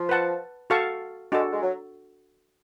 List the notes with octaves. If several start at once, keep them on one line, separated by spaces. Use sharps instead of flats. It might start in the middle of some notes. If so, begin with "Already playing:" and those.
Already playing: F3
B4 F#5 A5
F#4 A4 F5 A5 C#6
G#3 D4 F#4 A4
G#3
F#3